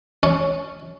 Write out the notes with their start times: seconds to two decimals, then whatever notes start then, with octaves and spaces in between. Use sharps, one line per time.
0.23 C#4